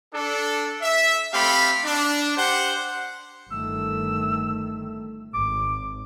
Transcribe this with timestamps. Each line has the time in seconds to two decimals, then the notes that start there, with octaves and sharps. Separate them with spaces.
0.13 D4 A4
0.81 E5
1.33 A3 C4 G4 A4 F5 B5
1.85 D4
2.37 G4 C5 F#5
3.52 G1 D#3 A3 E6
5.34 G#1 D6